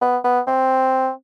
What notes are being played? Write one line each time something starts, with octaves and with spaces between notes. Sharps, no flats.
B3
B3
C4